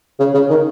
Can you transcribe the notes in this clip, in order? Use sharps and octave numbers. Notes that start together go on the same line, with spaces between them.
C#3
C#3
D#3